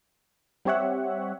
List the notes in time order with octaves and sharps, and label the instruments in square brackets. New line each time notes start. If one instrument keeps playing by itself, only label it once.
[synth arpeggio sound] G3 C4 G4 C#5 E5 F#5